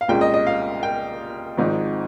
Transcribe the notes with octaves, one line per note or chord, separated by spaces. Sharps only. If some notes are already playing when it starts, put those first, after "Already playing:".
F5
C2 A#2 G#3 C#4 G5
D#5
D#5
F5
G5
G#1 G#2 F3 C4 D#4